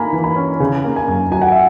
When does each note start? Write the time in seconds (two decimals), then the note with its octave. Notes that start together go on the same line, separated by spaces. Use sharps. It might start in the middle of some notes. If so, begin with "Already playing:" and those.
Already playing: A#3 G#5 A#5 B5
0.13 E3
0.24 B5
0.36 C#4
0.60 C#3 G#5
0.84 A#3
0.96 G#5
1.08 F#2
1.31 F#3 G#5
1.42 F#5
1.52 E5